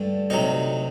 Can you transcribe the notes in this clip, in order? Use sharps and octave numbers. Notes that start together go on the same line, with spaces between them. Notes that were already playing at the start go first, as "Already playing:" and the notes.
Already playing: G2 D3 A3
D2 C3 F#3 D#4